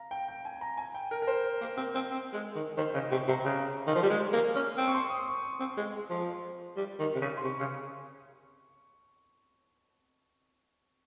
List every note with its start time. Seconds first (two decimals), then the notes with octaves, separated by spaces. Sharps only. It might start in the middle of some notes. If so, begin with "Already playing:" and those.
Already playing: F5 A#5
0.11 G5
0.28 G5
0.45 G#5
0.61 A#5
0.78 G#5
0.95 G5
1.11 A#4
1.22 A#4
1.27 C5
1.61 A#3
1.77 C4
1.94 C4
2.11 C4
2.33 G#3
2.56 D#3
2.78 D#3 C5
2.94 C#3 D#5
3.10 C3 C#6
3.28 C3 A#5
3.44 C#3 A#5
3.87 D#3
3.95 F3
4.03 G3
4.10 G#3
4.33 A#3
4.55 C#4
4.77 C4
4.87 C#6
4.94 C6
5.10 D#6
5.27 C#6
5.60 C4
5.77 G#3
6.10 F3
6.77 G3
6.99 D#3
7.15 C3
7.21 C#3
7.37 C6
7.43 C3 C#6
7.60 C#3